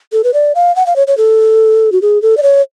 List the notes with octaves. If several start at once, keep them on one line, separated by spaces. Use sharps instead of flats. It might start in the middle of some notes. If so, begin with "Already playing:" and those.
A4
B4
D5
F5
F#5
F5
C#5
C#5
A4
F#4
G#4
A4
D5
C#5